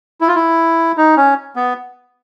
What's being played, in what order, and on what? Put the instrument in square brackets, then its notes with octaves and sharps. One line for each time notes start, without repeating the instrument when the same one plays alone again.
[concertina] E4
F4
E4
D#4
C#4
B3